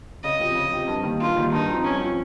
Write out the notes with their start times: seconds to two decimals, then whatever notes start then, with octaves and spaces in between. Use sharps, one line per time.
0.23 C#3 D#5
0.39 F3 C4 G4
0.55 C#3
0.71 F3 C4 G4
0.87 G2
1.03 D#3 G3 A#3
1.19 G2 F4
1.36 D#3 G3 A#3
1.52 G2 D#4
1.68 F3 C4
1.84 G2 C#4
2.00 F3 C4